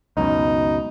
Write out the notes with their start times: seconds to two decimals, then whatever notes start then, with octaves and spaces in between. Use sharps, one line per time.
0.17 C#2 F#2 B2 D#4